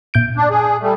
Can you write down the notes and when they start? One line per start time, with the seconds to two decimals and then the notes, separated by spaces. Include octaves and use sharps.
0.14 A#2 G6 D7
0.36 D4
0.50 G#4
0.81 G3 A3